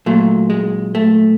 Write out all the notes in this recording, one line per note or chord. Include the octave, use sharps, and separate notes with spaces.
A#2 F#3 A3
G#3
A3